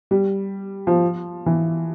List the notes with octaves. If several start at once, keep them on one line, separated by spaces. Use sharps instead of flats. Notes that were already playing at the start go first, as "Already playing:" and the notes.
G3
F3
E3